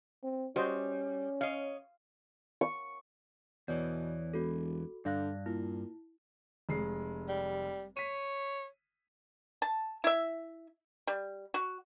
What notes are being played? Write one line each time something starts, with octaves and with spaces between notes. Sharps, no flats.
C4
G3 C#4 F#4 C5 D#5
C#5 D#5 F5
C#6
E2 B2 E3 C#5 D5
E1 F#4 A4
G2 D3 D5 F5 F#6
A#2 E4
F1 G#3 C7
G3
C#5 B6 D#7
A5
E4 E5
G3
F#4